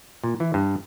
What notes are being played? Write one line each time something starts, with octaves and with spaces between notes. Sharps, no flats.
A#2
E3
G2